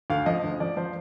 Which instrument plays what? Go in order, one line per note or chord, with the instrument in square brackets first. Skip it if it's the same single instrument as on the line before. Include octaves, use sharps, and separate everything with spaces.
[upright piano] D2 F5
F3 D#5
D2
F3 D5
F3 C5